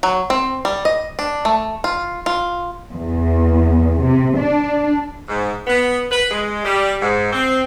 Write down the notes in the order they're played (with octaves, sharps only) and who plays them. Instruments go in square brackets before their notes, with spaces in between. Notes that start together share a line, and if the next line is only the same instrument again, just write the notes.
[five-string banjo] F#3
C4
G3
D#5
D4
A3
F4
F4
[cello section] E2
C3
D4
[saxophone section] G#2
B3
B4
G#3
G3
G#2
C4